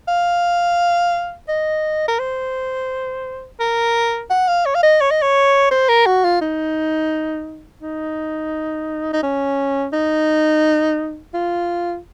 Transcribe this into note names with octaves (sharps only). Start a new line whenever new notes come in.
F5
D#5
A#4
C5
A#4
F#5
F5
C#5
F5
D#5
C#5
D#5
C#5
C5
A#4
F#4
F4
D#4
D#4
D#4
C#4
D#4
F4